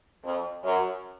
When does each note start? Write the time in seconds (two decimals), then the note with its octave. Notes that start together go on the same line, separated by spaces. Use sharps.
0.23 F2
0.64 F#2